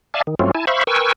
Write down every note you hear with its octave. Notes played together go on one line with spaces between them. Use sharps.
D5 E5 F5 G#5 A5
D#3
G2 F#3 A3 C4 C#4 F4
E4 G#5 A5
C5 E5 F5 B5 C#6
A#4 B4 G5 G#5 C#6 E6